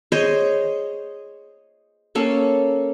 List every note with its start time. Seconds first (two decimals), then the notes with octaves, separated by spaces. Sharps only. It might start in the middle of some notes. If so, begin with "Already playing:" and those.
0.12 G#4 C5 C#5 D#5
2.15 A#3 C#4 A4